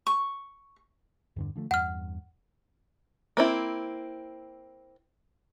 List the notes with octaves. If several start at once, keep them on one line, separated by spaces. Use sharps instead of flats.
C#6
E2 G2 D3
D3 F3 A3
E2 G2 F#5 F6
A#3 C4 E4